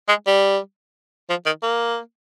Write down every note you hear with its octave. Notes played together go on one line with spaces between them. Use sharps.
G#3
G3
F3
D#3
A#3